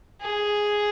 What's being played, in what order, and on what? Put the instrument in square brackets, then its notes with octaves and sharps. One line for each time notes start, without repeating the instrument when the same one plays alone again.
[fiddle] G#4